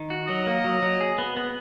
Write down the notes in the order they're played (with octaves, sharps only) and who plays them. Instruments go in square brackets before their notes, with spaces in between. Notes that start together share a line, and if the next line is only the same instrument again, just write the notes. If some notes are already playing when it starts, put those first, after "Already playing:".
Already playing: [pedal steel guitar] D#3
F#4
[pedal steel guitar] F#3 [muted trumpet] D#5
[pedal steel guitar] A#3
F#3
F#3
G#4
B3
B3